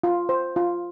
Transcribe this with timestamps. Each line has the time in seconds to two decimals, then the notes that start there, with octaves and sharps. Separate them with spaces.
0.04 F4
0.29 C5
0.56 F4